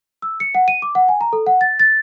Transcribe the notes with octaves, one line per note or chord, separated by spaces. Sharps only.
E6
C#7
F#5
D#7
D6
F#5
G#5
A#5
A4
F#5
A6
A6